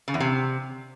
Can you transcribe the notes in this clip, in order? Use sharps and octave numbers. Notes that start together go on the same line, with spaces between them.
C#3
E2
C3